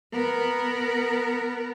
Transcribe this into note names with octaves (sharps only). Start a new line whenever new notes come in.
B3 A#4